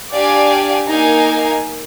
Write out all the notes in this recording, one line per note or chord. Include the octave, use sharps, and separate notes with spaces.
D4 G4 D5 F5 G#5
A#3 D#4 A#4 F5 G#5